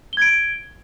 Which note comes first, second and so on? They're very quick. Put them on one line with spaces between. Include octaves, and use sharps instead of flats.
G7 G#6 D7